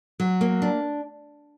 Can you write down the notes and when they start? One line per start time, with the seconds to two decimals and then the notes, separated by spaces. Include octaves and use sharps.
0.20 F#3
0.41 A#3
0.62 D4